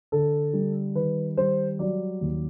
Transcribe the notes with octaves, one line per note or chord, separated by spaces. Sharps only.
D3 A4
G3
D#3 B4
G3 C5
F#3 D5
D#2